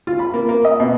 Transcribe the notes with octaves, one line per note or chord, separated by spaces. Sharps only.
F4
B5
A#3
A#3
D#5
B2